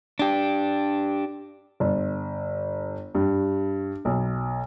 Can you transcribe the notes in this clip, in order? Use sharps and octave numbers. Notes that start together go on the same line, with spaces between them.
D4 G4
G1
G2
B1